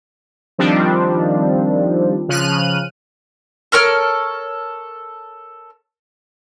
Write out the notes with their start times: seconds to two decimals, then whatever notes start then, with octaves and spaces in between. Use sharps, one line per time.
0.58 D#3 F3 G3 C4 D4
2.29 C#3 F3 F6 F#6 D#7
3.72 A4 A#4 C#5 F6